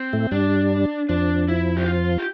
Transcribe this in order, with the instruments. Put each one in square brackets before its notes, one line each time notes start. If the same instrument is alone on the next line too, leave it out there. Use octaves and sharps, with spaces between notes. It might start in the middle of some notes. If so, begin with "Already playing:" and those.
Already playing: [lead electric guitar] C4
[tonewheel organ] A2 A3
[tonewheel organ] G2 G3 [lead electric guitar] D4
[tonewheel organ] F2 F3 [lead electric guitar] D4
[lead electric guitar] E4
G4
F4
G4